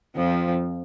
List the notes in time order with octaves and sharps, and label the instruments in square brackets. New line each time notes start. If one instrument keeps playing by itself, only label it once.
[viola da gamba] F2 F3